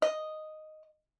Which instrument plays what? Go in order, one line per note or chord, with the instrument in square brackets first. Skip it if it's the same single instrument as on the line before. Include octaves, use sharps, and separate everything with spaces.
[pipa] D#5